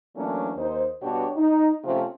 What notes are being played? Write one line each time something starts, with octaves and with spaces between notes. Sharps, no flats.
E3 F#3 A3 A#3 C#4 D4
D#2 D#4 C5
G2 B2 D4 F#4 G4 C#5
D#4
C3 F3 A3 C4 C#4 F4